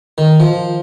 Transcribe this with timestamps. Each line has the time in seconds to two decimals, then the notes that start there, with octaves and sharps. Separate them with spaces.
0.18 D#3
0.40 F3